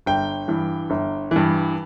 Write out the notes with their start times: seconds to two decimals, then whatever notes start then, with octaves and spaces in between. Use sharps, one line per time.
0.06 G1 G5
0.48 G2 E3
0.90 G1
1.31 G2 E3